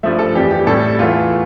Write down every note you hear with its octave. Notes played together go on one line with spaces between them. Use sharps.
G2 F3 A3 E5
A4
F2 E3 G3 G4
G4
A2 G3 A4
E2 E3 A3 F4